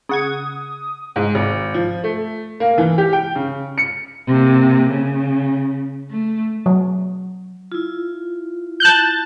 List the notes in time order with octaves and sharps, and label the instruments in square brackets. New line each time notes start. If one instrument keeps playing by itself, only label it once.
[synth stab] C#3 F#5 G#6 [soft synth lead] D#6
[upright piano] G#2
G#1
F3
A3
A#3
E3
G4
G5
C#3
C#7
[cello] C3 A#3
C#3
A3
[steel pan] F#3
[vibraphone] E4 F4
[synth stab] A5 F#6 G6